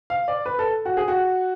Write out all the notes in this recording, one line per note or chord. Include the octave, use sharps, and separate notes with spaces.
F5
D5
B4
A4
F#4
G#4
F#4